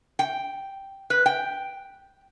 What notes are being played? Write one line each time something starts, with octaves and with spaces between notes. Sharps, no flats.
G5
B4
G5